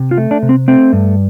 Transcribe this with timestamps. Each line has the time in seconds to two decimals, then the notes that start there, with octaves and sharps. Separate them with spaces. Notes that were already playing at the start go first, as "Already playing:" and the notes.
Already playing: C3
0.11 F4
0.18 A3
0.31 D4
0.43 C3
0.49 C4
0.68 A3 C4
0.93 G2